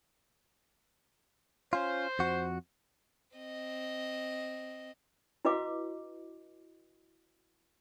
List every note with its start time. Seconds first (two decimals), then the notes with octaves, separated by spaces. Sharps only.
1.73 C#4 F4 C5
2.19 F2 F#4
3.37 C4 D#5
5.45 E4 F#4 B4 D#5 F5 D6